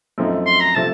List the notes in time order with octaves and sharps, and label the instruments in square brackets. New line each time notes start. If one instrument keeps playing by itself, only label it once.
[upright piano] F#2 F3 A3 C4 D#4
[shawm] C6
A#5
[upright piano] C3 F3 A3 C4 [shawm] A5